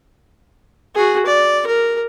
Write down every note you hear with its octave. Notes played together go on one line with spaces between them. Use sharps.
F#4 G#4
D5
A#4